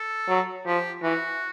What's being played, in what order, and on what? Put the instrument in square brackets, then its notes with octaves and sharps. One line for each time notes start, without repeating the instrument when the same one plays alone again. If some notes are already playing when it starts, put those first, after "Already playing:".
Already playing: [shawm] A4
[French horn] F#3
[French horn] F3 [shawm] G4
[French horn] E3 [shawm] F#4